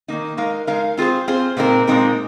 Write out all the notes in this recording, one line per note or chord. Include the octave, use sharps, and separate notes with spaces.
D#3 A#3 D#4
G#3 D#4 A#4 F5
G#3 D#4 A#4 F5
C4 F4 G#4 C5
C4 F4 G#4 C5
A#2 G#3 C4 D#4 A#4
A#2 G#3 C4 D#4 A#4